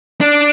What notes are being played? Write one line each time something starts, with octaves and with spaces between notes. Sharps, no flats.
D4